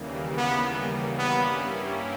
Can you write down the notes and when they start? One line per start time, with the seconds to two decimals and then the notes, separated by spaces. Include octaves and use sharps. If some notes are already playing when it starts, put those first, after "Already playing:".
Already playing: D#2 C#3 E3 G3 A#3
0.37 B3
1.17 G2 G3 A#3 B3 C#4 E4